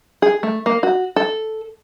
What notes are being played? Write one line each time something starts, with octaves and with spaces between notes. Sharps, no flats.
G#4
A3
A#3
F#4
A4